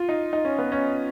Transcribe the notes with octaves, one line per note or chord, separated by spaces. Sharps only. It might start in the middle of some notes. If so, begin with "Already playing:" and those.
Already playing: F4
D#4
D#4
C#4
B3
C#4